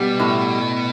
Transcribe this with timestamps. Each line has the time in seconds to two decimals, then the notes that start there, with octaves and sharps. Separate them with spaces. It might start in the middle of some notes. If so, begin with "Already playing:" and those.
Already playing: B2 G3
0.20 A2